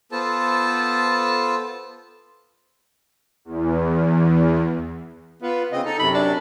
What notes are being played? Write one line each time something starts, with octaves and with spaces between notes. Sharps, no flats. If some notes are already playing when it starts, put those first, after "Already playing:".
B3 F4 A4 C5 A5
E2
B3 F4 B4
C#3 C4 D#5
D#4 A4
F#2 C3 F#3 B5
D4